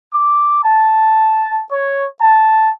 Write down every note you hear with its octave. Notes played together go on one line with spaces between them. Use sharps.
D6
A5
C#5
A5